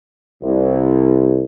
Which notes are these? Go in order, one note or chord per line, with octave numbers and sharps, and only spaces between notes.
C2